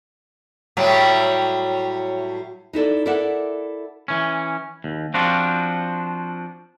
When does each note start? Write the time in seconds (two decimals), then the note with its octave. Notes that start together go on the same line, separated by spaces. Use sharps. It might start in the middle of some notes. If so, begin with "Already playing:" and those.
0.77 A2 F#3 G3
2.73 D#4 E4 A4 D5
3.06 E4 A4 A#4 D5 E5 F#5
4.08 E3 C#4
4.84 D#2
5.14 F3 C4 D4 F4 F#4